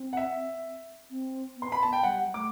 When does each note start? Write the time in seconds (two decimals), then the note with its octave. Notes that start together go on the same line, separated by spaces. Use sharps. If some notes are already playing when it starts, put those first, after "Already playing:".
Already playing: C4
0.13 F#5
0.17 E5
1.10 C4
1.57 B3
1.62 C6
1.72 B5
1.83 A5
1.93 G5
2.03 G3 F#5
2.34 A3 D6